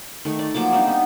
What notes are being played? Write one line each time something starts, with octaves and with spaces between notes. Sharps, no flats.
D#3 A3 C#6
D5
F3 F#3 A#3 D6
G3 C4 D4 D#4
B3